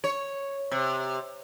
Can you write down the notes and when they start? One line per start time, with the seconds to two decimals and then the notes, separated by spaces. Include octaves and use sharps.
0.04 C#5
0.71 C3